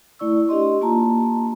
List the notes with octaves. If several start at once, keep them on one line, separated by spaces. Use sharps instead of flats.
A3 E4 D5 C#6 E6
D4 G4 D#5 C6
A#3 F4 A5 A#5